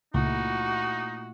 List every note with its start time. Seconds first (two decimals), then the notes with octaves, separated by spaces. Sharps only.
0.14 C#2 A#2 A3 D#4 E4 F#4